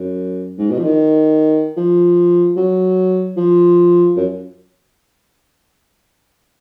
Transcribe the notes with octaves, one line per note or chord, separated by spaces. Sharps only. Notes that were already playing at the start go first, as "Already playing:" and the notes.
Already playing: F#2
G#2
B2
F3
D#3
F3
F#3
F3
F#2